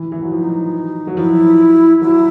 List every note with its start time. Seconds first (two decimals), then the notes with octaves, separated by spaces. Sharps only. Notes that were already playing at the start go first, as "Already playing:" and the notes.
Already playing: E3
0.12 E3
0.22 F#3
0.31 F3 D#4
1.07 F#3
1.17 F3 E4
2.01 F#3 E4